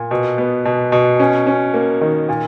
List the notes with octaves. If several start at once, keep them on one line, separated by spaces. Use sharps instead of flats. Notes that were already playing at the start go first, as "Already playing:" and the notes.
Already playing: A#2
B2
B3
B2
B2
C#4
C#4
A#3
D#3
A#2